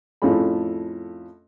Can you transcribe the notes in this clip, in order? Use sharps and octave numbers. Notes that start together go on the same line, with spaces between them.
F2 A2 A3 C#4 G#4 B5